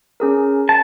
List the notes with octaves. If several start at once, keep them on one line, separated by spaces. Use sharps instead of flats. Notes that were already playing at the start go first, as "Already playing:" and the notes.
C#4 G#4 A#4
A5